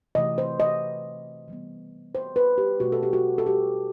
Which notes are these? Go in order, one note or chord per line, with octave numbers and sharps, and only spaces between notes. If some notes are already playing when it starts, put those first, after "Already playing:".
C3 E3 A3 D#5
C5
D#5
E3 G3 B3
C5
B4
G4
B2 A3 F#4
A4
G4
F#4
A4
G4